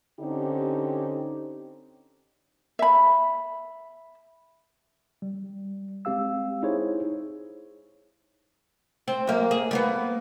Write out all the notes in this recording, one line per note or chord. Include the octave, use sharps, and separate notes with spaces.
D3 C4 C#4 D#4 G4
E5 B5
G3
G#3 C4 G4 F5 E6
D#4 E4 G#4 C5 C#5
C4
F#2 A#3
G#4
G3 A#3 B3